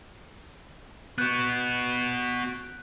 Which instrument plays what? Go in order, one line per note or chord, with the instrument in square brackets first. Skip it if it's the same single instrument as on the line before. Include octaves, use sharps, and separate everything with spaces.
[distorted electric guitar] B3 F#4 [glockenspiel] F#6 G6